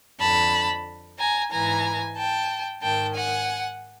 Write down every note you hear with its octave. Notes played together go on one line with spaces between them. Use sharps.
F2 D3 A5 B5
G#5 A#5
G#2 E3 G#5 A#5
G5 A5
G#2 D#3 G5 A5
F#5 G#5